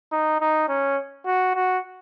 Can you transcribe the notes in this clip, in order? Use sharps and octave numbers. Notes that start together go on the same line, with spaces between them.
D#4
D#4
C#4
F#4
F#4